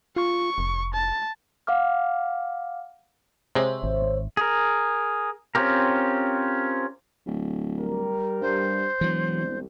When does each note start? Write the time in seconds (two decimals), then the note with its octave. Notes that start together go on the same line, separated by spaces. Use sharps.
0.16 F4 C#6
0.58 F1
0.94 A5
1.67 F5 F#5 D6 F6
3.55 C3 G#3 C5 C#5 E5
3.83 G#1
4.37 G#4 A#4
5.55 C4 C#4 F4 G4 A#4
7.26 D1
7.80 G3 G4 A#4
8.41 G2 C5
9.01 E1 E3 F#3
9.35 C2